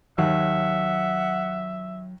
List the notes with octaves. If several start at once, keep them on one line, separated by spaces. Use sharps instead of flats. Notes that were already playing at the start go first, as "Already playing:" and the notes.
D#2 F#3 E5 F#5